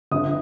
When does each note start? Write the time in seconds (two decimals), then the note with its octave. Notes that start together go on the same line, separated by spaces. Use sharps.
0.11 G1 D#6